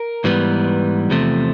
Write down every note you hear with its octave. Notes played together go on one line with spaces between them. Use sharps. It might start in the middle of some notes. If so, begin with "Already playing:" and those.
Already playing: A#4
G#2 E3 G3 B3
E2 C3 F3 A3